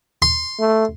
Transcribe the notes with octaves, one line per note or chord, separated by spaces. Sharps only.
C6
A3